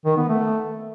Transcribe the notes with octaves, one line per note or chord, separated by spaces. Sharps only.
D#3
B3
A3